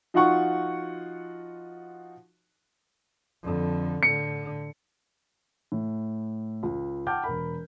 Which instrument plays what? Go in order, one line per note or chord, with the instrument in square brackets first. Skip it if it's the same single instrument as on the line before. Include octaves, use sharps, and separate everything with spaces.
[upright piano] F3 D#4 F4 F#4 F#5 C#6
[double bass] F2 D3
[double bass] A2 D3 [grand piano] C#7
[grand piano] A2
C#2
F#5 G5 A5 D6 F6 G6
E1 A#4 B5